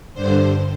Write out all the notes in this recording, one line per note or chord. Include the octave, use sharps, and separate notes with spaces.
G2 D3 C5